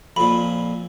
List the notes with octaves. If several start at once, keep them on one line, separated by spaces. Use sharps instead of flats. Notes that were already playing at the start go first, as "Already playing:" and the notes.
F2 A#2 B5